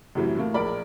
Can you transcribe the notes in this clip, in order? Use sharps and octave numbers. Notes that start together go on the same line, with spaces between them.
F#2 A2 C3 E3 F#3 G3
A2 A3 A#3
A#1 G#3 A#4 D5 B5